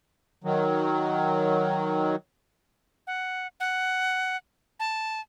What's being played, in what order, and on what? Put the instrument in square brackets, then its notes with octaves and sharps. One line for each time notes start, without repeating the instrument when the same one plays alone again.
[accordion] D#3 F#3
[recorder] F#5
F#5
A5